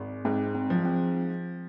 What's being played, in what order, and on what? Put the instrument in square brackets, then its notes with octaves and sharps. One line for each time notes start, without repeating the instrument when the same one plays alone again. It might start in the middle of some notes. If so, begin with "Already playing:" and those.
Already playing: [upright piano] G#1 G#3
[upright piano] G#2 [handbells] C4
[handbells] C4
[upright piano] F3
[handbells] C4